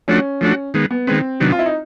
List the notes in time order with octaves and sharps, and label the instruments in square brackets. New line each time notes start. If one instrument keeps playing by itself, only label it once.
[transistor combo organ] F3 A3 D4 F#4 [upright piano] C#4
[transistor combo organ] F3 A3 D4 F#4
D#3 G#3 B3
[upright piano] B3
[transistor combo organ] D#3 G#3 B3 [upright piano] C4
[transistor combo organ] C3 D#3 F#3 B3 D4
[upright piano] F4
E4
D#4